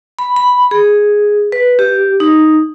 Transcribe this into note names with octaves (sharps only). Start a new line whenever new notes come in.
B5
B5
G#4
B4
G4
D#4